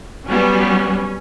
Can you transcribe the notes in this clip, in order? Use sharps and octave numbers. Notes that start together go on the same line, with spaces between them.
F#3 G3 B3 C#4